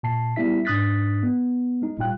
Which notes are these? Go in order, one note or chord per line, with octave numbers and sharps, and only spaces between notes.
A#2 A5 C7
G3 B3 E4 E5 B6
G#2 D4 D#6 F#6 A6 B6
B3
G#3 D#4
G1 A#2 G3 F4 G5 F#6